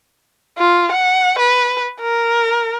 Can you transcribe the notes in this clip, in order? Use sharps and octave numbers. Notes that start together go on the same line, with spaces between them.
F4
F#5
B4
A#4